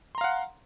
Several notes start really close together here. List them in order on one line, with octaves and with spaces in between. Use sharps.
C6 A#5 F5 F#5